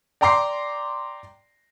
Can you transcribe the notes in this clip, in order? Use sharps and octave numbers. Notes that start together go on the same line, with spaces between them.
D5 G5 A#5 C6 D6 C7